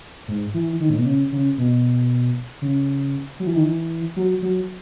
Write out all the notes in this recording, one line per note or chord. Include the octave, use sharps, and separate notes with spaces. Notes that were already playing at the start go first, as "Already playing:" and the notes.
G#2
E3
D#3
A2
B2
C#3
C#3
B2
C#3
F#3
E3
D#3
E3
F#3
F#3